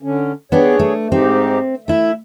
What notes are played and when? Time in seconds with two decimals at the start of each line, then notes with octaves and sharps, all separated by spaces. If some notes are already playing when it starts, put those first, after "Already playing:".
0.02 D3 C#4
0.52 B3 D4 G4 G#4 C#5
0.79 A3
1.12 G#2 C4 D#4 G4
1.88 A3 E4 E5